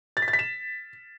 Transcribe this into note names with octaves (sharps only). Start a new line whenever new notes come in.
A6
B6
A6
B6
E7